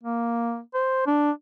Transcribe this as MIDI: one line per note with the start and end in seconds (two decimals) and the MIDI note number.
0.03 0.59 58
0.74 1.05 72
1.06 1.31 62